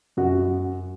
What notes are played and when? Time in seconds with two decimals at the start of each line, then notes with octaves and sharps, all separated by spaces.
0.17 F#2 F#4